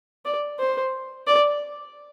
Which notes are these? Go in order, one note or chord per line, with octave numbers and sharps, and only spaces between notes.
D5
C5
D5